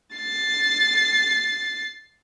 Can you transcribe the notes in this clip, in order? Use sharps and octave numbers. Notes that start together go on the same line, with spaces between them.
A6 C7